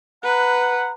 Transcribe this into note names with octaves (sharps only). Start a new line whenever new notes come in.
B4 F#5 A#5